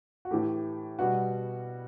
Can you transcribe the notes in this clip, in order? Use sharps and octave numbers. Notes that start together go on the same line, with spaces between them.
F#4
A2 E3 A3 G4
B2 G3 B3 F#4